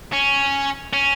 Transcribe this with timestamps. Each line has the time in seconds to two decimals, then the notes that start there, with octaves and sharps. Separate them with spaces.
0.13 C#4
0.93 C#4